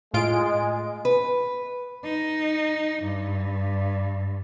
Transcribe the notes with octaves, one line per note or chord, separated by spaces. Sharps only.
A2 G#3 F4 D7
B4
D#4
G2